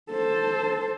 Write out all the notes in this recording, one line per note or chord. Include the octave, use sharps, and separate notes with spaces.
A4 C5